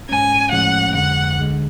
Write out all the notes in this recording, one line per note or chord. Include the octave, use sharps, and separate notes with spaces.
G#2 G#3 C#4 G#5
A2 F3 G#3 C#4 F#5
F2 D3 G#3 F#5
D2 D3 G#3